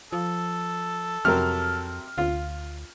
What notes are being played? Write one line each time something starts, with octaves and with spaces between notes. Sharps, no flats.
F3 A4
F2 C3 F#3 A#4 F6
D2 F4